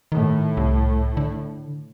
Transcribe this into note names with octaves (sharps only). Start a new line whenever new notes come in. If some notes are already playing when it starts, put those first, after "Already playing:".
A2 D#3
C2
D3